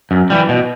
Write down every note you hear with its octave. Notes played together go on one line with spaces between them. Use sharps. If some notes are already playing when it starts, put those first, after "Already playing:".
F#2
E3 G3
B2